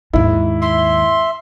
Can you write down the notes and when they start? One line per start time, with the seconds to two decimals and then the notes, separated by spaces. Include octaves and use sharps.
0.13 D#2 G#2 E4
0.61 E5 C6